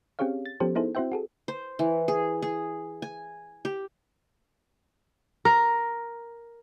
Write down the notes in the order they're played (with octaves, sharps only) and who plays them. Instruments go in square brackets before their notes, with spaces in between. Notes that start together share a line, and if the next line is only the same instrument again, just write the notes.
[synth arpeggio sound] C4 C#4 G4 G#4 C#5 F5
A6
F3 B3 C#4 G4 A4 C5
B3 D#4 E4 G#4 A4 C5
C4 E4 F#4 C5 E5 G5
F#4 G#4 A4
[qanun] C5
E3
G#4
G#4
G#5
G4
[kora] A#4